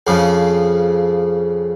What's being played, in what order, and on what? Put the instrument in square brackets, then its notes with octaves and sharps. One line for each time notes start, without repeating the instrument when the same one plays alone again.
[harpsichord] F2 C#3 F3